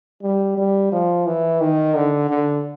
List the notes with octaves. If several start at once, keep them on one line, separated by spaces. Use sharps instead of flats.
G3
G3
F3
E3
D#3
D3
D3